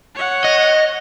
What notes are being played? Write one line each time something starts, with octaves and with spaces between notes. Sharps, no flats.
C#5 F#5
D#5